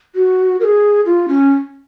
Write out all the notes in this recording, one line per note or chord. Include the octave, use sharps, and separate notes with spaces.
F#4
A#4
G#4
F4
C#4